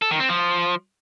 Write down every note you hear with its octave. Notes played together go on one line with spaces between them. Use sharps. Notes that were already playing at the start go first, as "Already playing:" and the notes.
A4
D#3
C4
F3